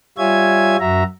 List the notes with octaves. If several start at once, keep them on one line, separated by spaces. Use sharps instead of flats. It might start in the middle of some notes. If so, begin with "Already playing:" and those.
G3 F4 C#5 E5 G#5 G#6
F#2 F#4 E5 A#5